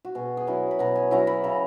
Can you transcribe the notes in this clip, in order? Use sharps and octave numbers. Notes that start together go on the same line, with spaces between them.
F#4
B2 G#4
G#4
F#3 C#4 E4
B5
B2 A#5
G#5
F#3 C#4 E4 A#5
B5
C#3 A#5